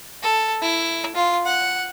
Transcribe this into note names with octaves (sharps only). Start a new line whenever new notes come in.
A4
E4
F4
F#5